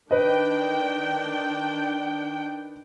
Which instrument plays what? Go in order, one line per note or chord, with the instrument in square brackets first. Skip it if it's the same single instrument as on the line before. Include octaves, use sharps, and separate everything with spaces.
[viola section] D#3 D4 G5 [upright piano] B4 D#5